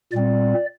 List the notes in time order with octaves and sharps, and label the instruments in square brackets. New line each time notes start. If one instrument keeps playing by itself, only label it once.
[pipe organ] A#2 G3 C4 D5